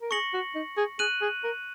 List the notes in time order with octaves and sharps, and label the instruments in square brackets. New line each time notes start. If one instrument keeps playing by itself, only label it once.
[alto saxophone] A#4
[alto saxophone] G#4 [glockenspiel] C#6 A#6 C#7 F#7
[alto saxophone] F#4
D#4
G#4
[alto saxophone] G#4 [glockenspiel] F#6 D#7 F#7
[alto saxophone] G#4
A#4